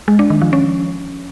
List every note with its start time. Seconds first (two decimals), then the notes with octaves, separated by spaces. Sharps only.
0.08 G#3
0.19 D4
0.30 D#3
0.42 F3
0.53 C#4